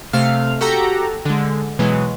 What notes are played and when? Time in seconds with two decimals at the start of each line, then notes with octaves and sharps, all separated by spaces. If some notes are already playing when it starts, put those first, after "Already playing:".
0.13 C3 A3 F5 F6
0.61 F#4 G4 A4 A#5
1.25 D3 G#3
1.79 B2 E3 F#3 G#3